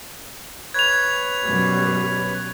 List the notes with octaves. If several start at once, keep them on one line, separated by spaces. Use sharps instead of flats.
B4 C#5 G#6 F7
F#2 B2 G3